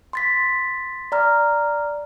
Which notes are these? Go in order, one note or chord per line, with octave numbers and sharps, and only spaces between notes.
C6 A6 B6
D5 A#5 F6